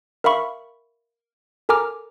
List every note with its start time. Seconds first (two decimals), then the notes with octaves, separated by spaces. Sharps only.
0.24 A#4 E5 F5 B5 C#6
1.69 A4 A#4 G#5 A#5 D6 F6